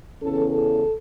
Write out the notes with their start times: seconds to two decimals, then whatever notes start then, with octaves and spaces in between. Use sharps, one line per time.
0.22 E2 C#3 E3 C#4 A4
0.51 A4